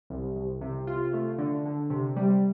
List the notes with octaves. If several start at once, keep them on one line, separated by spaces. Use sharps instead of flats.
C2
C2
C3
F4
A3
D3
D3
C3
G3